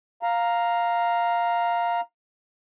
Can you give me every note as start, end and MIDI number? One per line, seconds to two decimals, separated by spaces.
0.23 2.01 77
0.23 2.01 82